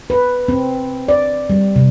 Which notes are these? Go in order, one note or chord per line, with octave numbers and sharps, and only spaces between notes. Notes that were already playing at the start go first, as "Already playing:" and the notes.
B4
C4
D5
G3
C3